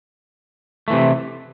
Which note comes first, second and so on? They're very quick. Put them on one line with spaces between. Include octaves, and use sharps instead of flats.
A3 E3 C3